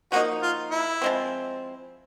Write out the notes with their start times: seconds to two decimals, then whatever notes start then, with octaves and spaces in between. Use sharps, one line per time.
0.12 F3 A#3 D#4 F#4
0.43 F4
0.71 E4
1.02 F3 G#3 C4